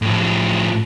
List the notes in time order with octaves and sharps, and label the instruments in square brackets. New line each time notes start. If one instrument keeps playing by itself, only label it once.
[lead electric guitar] A2 F3